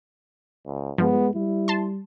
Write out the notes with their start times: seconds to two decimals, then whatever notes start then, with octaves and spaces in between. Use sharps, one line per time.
0.66 C#2
0.98 G2 F3 G#3 B3
1.35 G3 E4
1.68 A5 C6